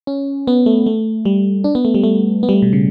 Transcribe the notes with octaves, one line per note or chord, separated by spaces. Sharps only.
C#4
B3
A3
A3
G3
D4
B3
A3
G3
A3
B3
G3
A3
B2
C#3